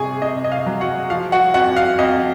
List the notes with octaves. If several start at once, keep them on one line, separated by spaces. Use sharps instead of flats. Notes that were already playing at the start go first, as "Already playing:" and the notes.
Already playing: C3 G#4 G#5 C#6
C3 D#5
D#5
F5
F#3
F#4 F#5
F3 F5
F#4 F#5
F2 F#4 F#5
F5
F2 D#5